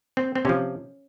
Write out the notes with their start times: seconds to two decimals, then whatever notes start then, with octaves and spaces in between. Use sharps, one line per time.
0.17 C4
0.35 C4
0.45 C3 F3 C#4